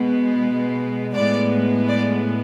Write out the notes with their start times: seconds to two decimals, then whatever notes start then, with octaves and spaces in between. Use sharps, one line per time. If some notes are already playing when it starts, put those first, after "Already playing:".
Already playing: B2 G#3 B3
1.14 A2 G#3 B3 D5
1.89 D5